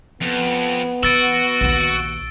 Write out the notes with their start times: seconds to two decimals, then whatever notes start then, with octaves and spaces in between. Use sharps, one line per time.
0.21 F2 B3
1.03 E3 F#4 E6 A6 D7
1.61 A#1 D#2